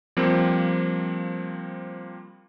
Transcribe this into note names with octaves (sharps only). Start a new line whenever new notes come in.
F3 G3 A#3 C4